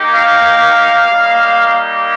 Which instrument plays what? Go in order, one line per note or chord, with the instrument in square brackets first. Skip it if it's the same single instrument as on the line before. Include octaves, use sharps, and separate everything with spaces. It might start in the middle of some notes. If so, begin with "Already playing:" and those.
Already playing: [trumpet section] A#3 D#4 G4
F5
G3 A#3 D#4 G4